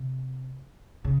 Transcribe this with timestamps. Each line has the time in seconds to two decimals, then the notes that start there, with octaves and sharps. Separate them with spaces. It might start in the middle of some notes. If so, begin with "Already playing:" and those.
Already playing: C3
1.05 C#3